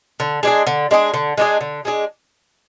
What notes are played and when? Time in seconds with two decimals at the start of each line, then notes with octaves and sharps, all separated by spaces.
0.20 D3
0.43 G#3 D4 G#4
0.67 D3
0.91 G#3 D4 G#4
1.14 D3
1.37 G#3 D4 G#4
1.61 D3
1.85 G#3 D4 G#4